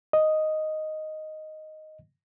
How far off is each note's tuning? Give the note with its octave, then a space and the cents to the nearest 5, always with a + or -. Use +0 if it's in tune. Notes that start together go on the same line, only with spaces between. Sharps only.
D#5 +0